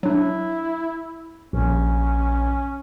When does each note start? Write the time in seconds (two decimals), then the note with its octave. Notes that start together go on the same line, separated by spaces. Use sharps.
0.03 F#3 D4 E4
1.53 A#1 C#4